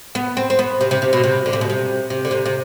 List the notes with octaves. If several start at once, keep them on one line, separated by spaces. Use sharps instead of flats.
B3
C4
C4
B3
C3
C3
C3
B2
C3
D3
C3
B2
C3
C3
D3
C3
C3